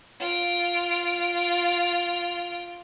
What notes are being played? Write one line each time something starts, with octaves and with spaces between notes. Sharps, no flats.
F4 D7